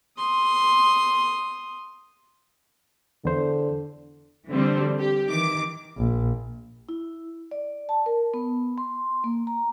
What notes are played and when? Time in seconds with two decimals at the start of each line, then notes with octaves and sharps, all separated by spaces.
0.18 C6 D#6
3.25 E2 D3 C5
4.48 D3 E3 G3 C4
4.98 G4
5.29 D#3 E3 D6
5.97 A#1
6.89 E4
7.51 D5
7.89 A5
8.06 A#4
8.34 B3
8.78 C6
9.24 A#3
9.47 A#5